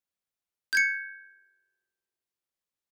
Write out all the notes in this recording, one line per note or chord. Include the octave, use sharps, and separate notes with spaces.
G6 G#6 C#7